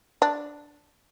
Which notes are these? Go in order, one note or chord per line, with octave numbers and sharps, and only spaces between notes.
D4